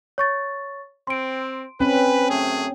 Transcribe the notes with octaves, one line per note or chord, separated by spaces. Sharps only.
C#5 C#6 A6
C4 C6 D7
C4 C#4 B4
F#2 A3 G#4